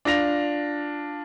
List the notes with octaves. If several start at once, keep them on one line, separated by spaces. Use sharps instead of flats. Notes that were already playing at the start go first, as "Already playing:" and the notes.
D4 F4 A#6 F7